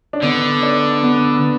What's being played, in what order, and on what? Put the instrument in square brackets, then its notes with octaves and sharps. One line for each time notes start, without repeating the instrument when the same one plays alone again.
[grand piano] D4
[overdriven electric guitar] D3 [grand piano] B3
[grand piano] D4
B3